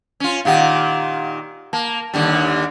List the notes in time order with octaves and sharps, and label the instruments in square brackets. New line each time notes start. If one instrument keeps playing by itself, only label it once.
[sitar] C#4 F4
[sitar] A#2 D#3 G4 [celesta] F5 F#5
[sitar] A#3 [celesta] A5
[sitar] D#2 D3 G3